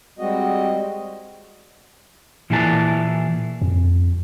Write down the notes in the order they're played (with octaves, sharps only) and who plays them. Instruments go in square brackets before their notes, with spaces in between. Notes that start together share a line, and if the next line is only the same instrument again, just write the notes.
[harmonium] G3 G#3 C4 F#4 D#5
[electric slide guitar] A#2 E3 E4 G#4 B4 A5
[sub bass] F2